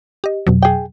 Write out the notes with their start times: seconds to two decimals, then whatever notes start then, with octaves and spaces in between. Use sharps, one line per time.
0.24 G4 D#5
0.47 F2 B2 F#3
0.63 G#4 G5